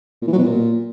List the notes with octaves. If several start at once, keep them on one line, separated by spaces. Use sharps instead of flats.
A#2
E3
F#3
B2
A#2